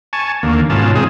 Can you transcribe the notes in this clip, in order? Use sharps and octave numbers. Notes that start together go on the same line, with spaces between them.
G#5 A5 C#6
D#2 D3 A#3
G#2 B2 C#4 F4 A5
D#3 G#3 C4 G#4